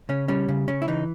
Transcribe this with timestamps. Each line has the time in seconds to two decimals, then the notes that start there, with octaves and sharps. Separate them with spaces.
0.09 C#3 C#4
0.28 G3 C#4
0.49 C#3
0.68 C#3 C#4
0.82 E4
0.88 E3 D#4